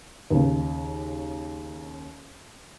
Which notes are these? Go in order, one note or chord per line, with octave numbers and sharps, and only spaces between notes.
D#2 C#3